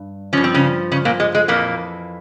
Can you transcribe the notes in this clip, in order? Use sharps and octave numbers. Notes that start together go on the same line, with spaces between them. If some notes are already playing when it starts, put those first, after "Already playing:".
Already playing: G2
G2 F3 C#4
C4
C#3 C#4
C#3 C#4
A#2 A#3
G#3
G#3
F2 A#2 E3 A#3